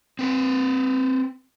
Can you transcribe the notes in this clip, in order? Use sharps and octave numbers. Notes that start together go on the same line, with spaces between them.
C4 B4